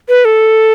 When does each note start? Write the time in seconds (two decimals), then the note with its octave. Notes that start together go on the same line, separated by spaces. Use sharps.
0.09 B4
0.25 A4